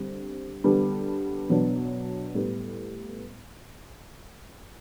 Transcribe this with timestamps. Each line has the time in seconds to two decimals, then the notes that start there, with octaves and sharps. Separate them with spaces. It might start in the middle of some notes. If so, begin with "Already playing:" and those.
Already playing: D3 G3 C4
0.64 D3 G3 B3
1.49 B2 F#3 B3 D4
2.35 A2 G3 B3